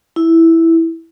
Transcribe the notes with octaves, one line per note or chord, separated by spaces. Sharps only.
E4